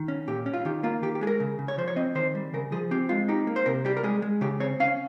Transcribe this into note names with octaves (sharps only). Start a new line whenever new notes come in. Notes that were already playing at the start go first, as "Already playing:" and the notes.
Already playing: D#3
C#4
A#2 G4
C#4
F4
D#3 G4
A#3 F4
D#3 G4
G4
G#3 G#4
A#4
C#3
C#3
C#5
F3 C5
C#5
C4 D#5
D#3 C5
G3
C#3 A#4
F3 G#4
C4 G4
G#3 F4
D#4 G4
A#3
C5
C3 A#4
G3 G4
A#4
G#3 G#4
G#3
C#3 G4
C4 C#5
C#4 F5